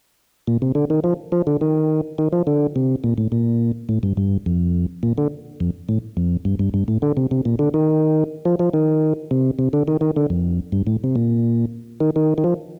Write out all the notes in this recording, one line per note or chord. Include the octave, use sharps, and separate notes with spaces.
A#2
C3
D3
D#3
F3
F3
D3
D#3
D#3
F3
D3
C3
A#2
A2
A#2
A2
G2
G2
F2
A#2
D3
F2
A2
F2
G2
G2
G2
A2
D3
C3
C3
A#2
D3
D#3
F3
F3
D#3
C3
C3
D3
D#3
D#3
D3
F2
G2
A2
C3
A#2
D#3
D#3
D#3
F3